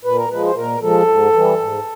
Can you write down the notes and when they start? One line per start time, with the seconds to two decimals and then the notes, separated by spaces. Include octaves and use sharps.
0.05 A#2 B4
0.17 A#4
0.31 F3 G#3 B4
0.43 C5
0.55 A#2 A#4
0.82 F3 G#3 A4
1.08 G#2
1.33 E3 G3
1.59 G#2